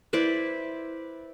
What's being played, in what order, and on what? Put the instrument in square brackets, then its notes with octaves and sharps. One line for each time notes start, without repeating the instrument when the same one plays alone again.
[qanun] E4 B4 C5 D5